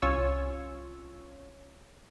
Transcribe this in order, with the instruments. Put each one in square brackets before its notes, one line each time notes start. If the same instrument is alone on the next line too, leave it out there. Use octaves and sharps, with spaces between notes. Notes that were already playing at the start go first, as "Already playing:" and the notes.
[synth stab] C2 C#4 F4 C#5 E6